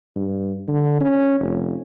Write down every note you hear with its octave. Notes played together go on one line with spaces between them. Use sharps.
G2
D3
C#4
F1